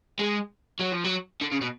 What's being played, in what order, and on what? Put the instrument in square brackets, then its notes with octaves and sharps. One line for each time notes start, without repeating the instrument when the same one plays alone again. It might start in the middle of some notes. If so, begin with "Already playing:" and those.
[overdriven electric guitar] G#3
F#3
F3
F#3
D3
C#3
B2